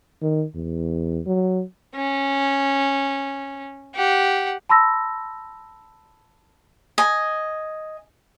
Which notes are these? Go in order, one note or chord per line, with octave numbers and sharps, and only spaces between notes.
D#3
E2
F#3
C#4
G4 F#5
A5 B5 C6 E6 A#6
D#5 G#5